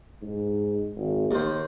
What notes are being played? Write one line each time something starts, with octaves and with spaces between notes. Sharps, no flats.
G#2
G#1
D#2 A#3 C5